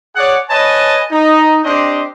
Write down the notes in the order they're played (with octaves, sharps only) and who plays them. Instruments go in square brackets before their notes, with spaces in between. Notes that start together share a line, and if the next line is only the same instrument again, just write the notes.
[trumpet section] G#4 C#5 D5 F#5
B4 C#5 D#5 G#5 A5
D#4
C4 D4 G4 C5 D#5